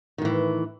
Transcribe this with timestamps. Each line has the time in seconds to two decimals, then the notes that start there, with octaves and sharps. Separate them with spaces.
0.18 D#3
0.22 A2
0.25 E3